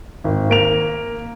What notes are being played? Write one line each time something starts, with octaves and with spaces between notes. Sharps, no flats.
G#1
A#3 D7 F7